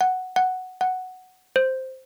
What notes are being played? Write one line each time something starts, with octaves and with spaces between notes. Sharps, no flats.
F#5
F#5
F#5
C5